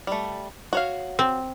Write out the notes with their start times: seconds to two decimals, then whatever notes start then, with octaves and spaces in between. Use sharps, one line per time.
0.07 G3 A3
0.73 F#4 C#5 F5
1.19 C4